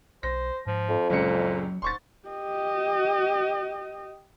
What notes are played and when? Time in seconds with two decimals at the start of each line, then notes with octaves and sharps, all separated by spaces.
0.23 B1 C5 A#6
0.66 G#2 F3
0.89 F2
1.10 F#1 C#2 A#2 F#3 C#7
1.82 D1 G#2 C6 C#6 A6
2.29 G4 D#5